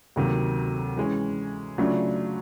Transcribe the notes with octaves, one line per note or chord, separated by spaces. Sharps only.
D2 C3 D#3 F#3 A#3
E3 G#3 C#4
C#3 F#3 A3 D4 F4